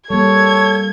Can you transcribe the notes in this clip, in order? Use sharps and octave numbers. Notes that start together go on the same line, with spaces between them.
G3 A#3 A4 C#5 G#6